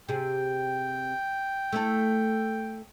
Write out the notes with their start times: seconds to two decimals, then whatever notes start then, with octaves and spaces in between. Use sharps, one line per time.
0.09 C3 G#4 G5
1.72 A3 E4 A4